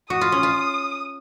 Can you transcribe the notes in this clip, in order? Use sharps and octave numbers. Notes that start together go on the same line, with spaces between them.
F#4 D#6
F4
C#4
F4